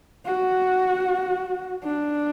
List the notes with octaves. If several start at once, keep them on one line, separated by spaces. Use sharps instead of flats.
F#4
D4